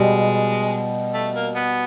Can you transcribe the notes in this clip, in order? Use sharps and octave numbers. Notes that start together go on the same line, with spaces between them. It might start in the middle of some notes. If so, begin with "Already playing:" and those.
Already playing: B2 G3 G#3 B3
A3
A#3
B3